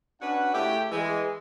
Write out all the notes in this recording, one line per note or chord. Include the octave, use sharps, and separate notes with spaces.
C#4 D4 F#4 B4 F#5
C#3 A3 E4 G4
E3 G#3